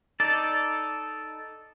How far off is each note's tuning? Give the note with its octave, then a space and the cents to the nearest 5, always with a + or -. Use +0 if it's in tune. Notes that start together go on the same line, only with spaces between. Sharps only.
D#4 +0 A4 -5 D5 -5